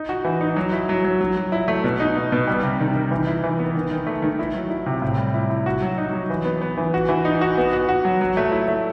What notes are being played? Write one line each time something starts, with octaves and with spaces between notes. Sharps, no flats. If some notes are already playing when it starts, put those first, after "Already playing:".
Already playing: D#4
F#4
E3
D#4
F#3
E4
F#3
F#3
F#3
F#3
E4
A3
B2
D#4
B2
B2
G3
C3
D#3
D#3
E3
E4
E3
B3
D#3
D#3
A3
D#3
E4
F#3
E4
C3
A2
G3
E4
E4
F#4
F#3
D#4
F#3
E3
B3
B3
E3
F#4
E3
D#4
F#4
B3
F#4
F#4
F#3
F#3
A3
E4
A3